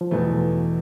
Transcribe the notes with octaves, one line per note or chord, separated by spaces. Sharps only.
F3
E2 B2 E3 A3